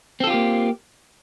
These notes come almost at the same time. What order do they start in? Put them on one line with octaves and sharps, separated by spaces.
C4 A4 F4 G4 A#3